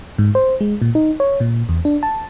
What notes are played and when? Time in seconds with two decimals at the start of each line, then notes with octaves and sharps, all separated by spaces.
0.18 G#2
0.35 C5
0.61 G#3
0.82 A#2
0.95 D#4
1.20 C#5
1.40 A#2
1.69 E2
1.85 D4
2.03 A5